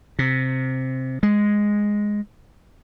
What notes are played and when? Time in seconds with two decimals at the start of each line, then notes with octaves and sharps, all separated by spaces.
0.19 C3
1.23 G#3